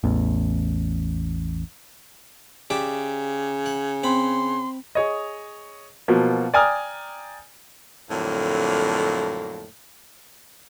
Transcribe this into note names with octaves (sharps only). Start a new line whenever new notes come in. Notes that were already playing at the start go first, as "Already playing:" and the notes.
A1 E2
C#3 G4 D5 E5
F#5
C4 B5 C6
G#4 C#5 D#5
B2 F3 F#3 A#3
D5 G5 G#5 A#5 D#6 F6
F2 A2 D3 F#3 A#3